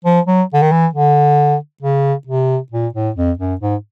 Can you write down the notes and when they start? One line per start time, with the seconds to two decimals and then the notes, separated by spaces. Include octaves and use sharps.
0.05 F3
0.27 F#3
0.54 D3
0.62 D#3
0.71 E3
0.94 D3
1.83 C#3
2.27 C3
2.72 A#2
2.94 A2
3.16 F2
3.39 F#2
3.61 G#2